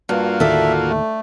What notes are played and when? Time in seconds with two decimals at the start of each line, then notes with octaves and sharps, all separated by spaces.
0.09 G2 A#3 F4 F#4
0.40 D#2 A2 D3 A4 D5 E5
0.90 A3